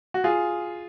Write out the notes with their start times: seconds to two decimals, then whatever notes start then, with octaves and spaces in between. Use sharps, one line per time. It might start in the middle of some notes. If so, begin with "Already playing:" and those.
0.14 F#4
0.24 F4 G#4